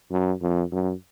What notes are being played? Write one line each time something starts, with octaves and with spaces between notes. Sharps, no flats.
F#2
F2
F#2